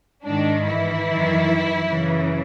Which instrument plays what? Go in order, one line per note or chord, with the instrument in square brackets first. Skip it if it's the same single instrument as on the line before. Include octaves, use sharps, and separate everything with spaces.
[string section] G#2 D#3 D4
E3 E4
F#2 D#3
F#2 C#3 E3